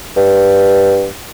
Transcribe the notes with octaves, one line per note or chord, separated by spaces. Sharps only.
G2